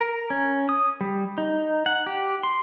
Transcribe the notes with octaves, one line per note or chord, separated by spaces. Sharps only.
A#4
C#4
D#6
G3
D#4
F#5
G4
C6